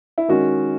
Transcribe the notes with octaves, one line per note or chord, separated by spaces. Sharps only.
E4
D#3 G#3 C#4 F#4